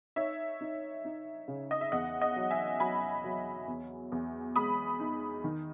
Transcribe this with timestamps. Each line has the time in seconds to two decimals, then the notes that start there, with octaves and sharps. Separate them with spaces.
0.16 D#4 C#5 E5
0.61 D#4
1.05 D#4
1.48 C#3
1.71 D#5
1.81 E5
1.92 E2 D#5 F#5
2.21 D#5 F#5
2.36 F#3
2.51 E5 G#5
2.80 F#3 G#5 B5
3.24 F#3
3.68 E2
4.12 E2
4.56 G#3 B5 D#6
5.00 D#4
5.44 D#3